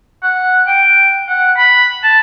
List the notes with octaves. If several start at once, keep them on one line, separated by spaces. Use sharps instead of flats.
F#5
G5
F#5
B5
A5